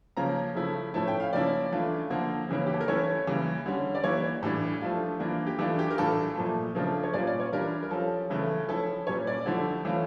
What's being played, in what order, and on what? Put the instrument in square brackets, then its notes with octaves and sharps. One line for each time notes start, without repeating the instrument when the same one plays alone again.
[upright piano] C#3 F3 A#3 C#4 A#5
C#3 F3 A3 E4
A2 F3 A3 C#4 E4 A5
G5
F5
C#3 F3 A#3 C#4 E4 D5
E3 A3 D4 F4
D3 F3 A#3
C#3 E3 A#3 C#4
G4
A4
A#4
E3 A3 C#4 E4 C#5
C#3 E3 G3 A#3
D3 G3 C#4
D5
E3 A#3 E4 C#5
A2 E3 G3 D4
F3 A3 D4 F4
E3 A#3 D4 F4
G4
E3 A3 D4 F4 A4
G4
A#4
A2 E3 A3 D4 F4 A4
A#2 F3 A3
C#3 F3 A3 D4 F4 A#4
C#5
A#2 G3 C#4 F4 D5
D5
C#5
E3 G3 D4 F4 A#4
A#4
F3 C#4 F4 A4
C#3 E3 A3
F3 C#4 E4 A4
A#2 G3 C#4 C#5
D5
D3 F3 A3 E4
E3 A3 C#4 F4